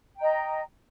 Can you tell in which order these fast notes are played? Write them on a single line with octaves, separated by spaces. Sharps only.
G5 A#5 D#5